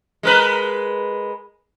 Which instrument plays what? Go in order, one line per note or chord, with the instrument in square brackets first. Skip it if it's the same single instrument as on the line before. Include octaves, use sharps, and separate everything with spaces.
[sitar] G#3 A#4 B4